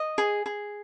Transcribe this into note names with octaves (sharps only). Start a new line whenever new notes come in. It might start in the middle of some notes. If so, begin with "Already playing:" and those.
Already playing: D#5
G#4
G#4